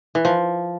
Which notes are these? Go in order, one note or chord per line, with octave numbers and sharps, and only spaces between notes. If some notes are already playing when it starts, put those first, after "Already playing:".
E3
F3